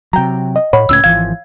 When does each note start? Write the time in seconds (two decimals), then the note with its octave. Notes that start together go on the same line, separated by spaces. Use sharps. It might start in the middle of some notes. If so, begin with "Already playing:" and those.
0.13 C3 F#3 G5 A#5
0.56 D#5
0.73 A2 C#5 F#5 B5
0.89 C#2 A2 C#4 E6 G#6
1.04 G#1 E3 F3 F5 G#6